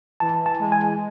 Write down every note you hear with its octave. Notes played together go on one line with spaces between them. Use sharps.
E3 A5
A5
G#3
G#5